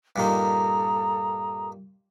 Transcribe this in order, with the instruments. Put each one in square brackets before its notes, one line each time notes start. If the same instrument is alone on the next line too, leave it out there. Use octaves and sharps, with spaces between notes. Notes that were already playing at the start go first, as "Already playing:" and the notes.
[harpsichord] G2 A#2 D#3 [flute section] A4 A#5 D#6